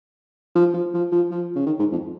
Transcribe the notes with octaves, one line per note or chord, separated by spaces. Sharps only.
F3
F3
F3
F3
F3
C#3
D#3
G#2
F2